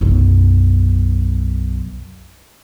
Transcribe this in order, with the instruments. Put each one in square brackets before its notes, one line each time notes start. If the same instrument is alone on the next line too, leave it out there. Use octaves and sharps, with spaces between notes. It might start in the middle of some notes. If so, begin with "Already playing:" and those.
[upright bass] B1 F#2